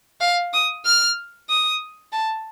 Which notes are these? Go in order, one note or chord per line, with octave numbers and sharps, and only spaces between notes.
F5
D#6
F6
D#6
A5